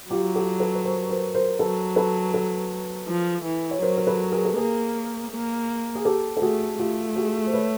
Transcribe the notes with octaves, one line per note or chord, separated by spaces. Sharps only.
F#3 F4 G4
G4 A4
A4 B4
B4
A#4 C5
A#4 C5
A#4 C5
F#3 A4 B4
A4 B4
A4 B4
F3
E3
C#5
F#3 A#4 C5
A#4
A4 B4
G#4 A#4
A4
A#3 G#4 A#4
A#3
G#4
G4 A4
A4
A3 F#4 G#4
A3 F4 G4
F#4 G#4
C5
B4 C#5